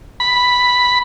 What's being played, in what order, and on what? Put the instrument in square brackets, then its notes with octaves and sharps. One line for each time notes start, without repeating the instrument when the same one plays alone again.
[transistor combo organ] B5